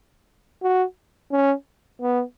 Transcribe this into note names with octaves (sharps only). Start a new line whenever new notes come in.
F#4
C#4
B3